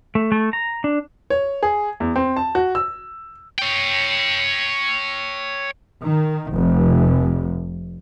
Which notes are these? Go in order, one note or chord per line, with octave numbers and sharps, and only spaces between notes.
A3
A3
A#5
D4
C#5
G#4
E2
C4
A5
F#4
E6
C#5 G5
D#3
F1